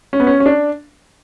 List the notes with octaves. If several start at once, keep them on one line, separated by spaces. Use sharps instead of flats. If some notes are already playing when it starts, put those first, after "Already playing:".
C#4
B3
C#4
C#4
D4